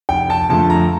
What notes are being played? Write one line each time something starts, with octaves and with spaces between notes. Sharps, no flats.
F1 G5
A5
F2 D3 F3 A3 A5
A#5